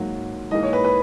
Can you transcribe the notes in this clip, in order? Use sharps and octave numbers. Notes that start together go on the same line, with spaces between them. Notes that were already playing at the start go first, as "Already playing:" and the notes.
Already playing: G#2 F#3 A#3
G#2 E3 A#3 D#5
C#5
B4
B4